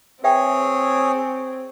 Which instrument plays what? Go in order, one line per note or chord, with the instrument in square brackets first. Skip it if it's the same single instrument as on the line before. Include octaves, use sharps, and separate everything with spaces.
[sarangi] C4 [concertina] G#4 C#5 [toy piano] B4 E5 G5